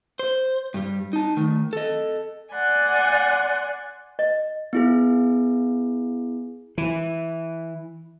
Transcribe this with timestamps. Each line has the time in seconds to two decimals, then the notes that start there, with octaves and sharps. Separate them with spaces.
0.19 C5
0.74 G2 G3
1.13 D#4 A5
1.37 D#3 A3
1.73 A4 D#5
2.53 D5 F#5 G#5 C6
4.19 D#5
4.73 B3 E4 G#4
6.78 E3